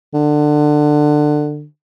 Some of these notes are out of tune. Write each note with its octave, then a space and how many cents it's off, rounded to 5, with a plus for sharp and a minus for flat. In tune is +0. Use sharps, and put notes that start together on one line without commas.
D3 +20